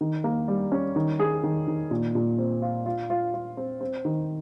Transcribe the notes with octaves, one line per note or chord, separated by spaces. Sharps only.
D#3
A#3
G3
C#4
D#3
G#4
D#3
D#3
A#2
A#2
C4
F4
F4
F4
F4
C4
C4
D#3